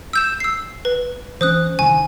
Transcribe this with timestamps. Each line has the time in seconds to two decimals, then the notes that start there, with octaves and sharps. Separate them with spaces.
0.13 E6 G6 E7
0.40 E6 C7
0.85 B4
1.41 E3 C#4 C5 D#6 F#6
1.79 C2 D#3 G#5